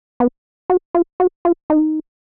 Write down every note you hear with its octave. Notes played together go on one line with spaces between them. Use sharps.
B3
F#4
F4
F#4
F4
D#4